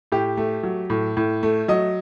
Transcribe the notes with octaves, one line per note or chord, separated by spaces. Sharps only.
A2 G4
A3
F#3
A2
A2
A3
F#3 D#5